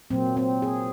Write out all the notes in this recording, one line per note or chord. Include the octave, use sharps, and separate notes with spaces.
A#2 F#3 A#3 C4
C4
G#4